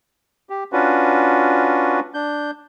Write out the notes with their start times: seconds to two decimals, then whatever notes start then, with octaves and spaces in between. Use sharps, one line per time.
0.50 G4
0.72 C#4 D4 F4 F#4 B4
2.14 D4 G6